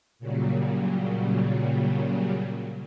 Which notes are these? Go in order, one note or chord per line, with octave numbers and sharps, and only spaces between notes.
A#2 C#3 F#3 G3